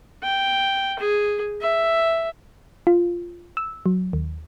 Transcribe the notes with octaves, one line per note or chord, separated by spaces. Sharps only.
G5
G#4
E5
F4
E6
F#3
D#2